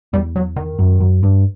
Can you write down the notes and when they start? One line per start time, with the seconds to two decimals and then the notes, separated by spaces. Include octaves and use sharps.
0.13 E2 G3
0.36 F#3
0.56 D#3
0.79 F#2
1.00 F#2
1.23 G2